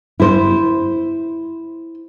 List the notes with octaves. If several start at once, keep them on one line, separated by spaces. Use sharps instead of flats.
E4 C5